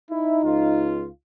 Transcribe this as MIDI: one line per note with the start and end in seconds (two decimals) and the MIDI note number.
0.11 1.10 63
0.11 0.38 64
0.44 1.07 37
0.44 1.07 65